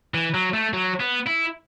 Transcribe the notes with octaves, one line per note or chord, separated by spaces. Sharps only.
E3
F#3
A3
F#3
B3
E4